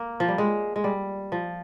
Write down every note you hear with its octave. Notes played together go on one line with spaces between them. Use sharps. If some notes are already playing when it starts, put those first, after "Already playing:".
Already playing: A#3
F3
G3
G#3
G#3
G3
F3